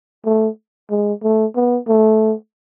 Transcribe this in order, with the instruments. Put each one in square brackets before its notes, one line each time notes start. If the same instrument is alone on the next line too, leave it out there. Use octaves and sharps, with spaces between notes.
[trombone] A3
G#3
A3
B3
A3